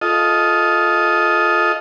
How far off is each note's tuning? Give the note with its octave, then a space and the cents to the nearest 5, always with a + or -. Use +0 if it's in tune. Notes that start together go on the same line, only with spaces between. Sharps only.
F4 +5 A4 -20 D#5 +10